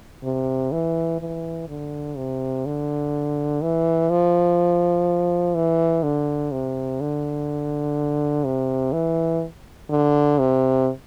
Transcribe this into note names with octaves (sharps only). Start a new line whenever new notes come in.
C3
E3
E3
D3
C3
D3
E3
F3
E3
D3
C3
D3
C3
E3
D3
C3